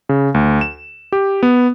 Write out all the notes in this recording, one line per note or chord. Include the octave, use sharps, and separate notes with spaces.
C#3
D2
E7
G4
B3